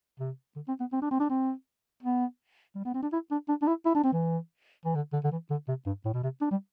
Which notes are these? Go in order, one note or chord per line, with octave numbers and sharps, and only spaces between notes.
C3
D3
C4
B3
C4
D4
C4
D4
C4
B3
G3
B3
C4
D4
E4
D4
D4
D4
E4
E4
D4
C4
E3
E3
D3
D3
D3
E3
D3
C3
G2
A2
B2
C3
D4
G3